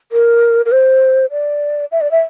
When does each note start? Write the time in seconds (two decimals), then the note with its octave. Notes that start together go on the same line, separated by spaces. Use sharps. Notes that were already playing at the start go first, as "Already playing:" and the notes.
0.12 A#4
0.66 A#4
0.72 C5
1.31 D5
1.92 E5
2.01 D5
2.11 E5